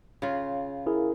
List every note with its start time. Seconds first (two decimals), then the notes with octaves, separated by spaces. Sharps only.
0.22 C#3 F4
0.86 E4 G#4 A#4